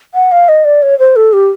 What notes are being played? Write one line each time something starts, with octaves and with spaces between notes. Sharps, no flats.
F#5
F5
D#5
D5
C#5
C5
A4
G4